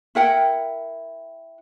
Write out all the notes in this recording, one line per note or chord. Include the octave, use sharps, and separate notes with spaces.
E4 A#4 F#5 G5